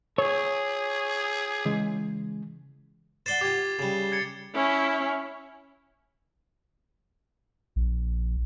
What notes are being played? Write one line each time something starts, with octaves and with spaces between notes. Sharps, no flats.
G#4 C#5
C#3 E3 G#3
C5 D5 F#5 A6 C7 G7
F4 G4 D6 G#6
C#3 G3
G#6 A6 C#7
C#4 E4
A#1